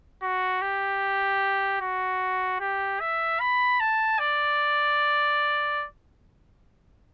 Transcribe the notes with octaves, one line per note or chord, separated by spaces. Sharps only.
F#4
G4
F#4
G4
E5
B5
A5
D5